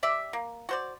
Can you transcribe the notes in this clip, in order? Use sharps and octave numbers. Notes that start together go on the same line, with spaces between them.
G4 D5 E5
A#3
F#4 C5 D5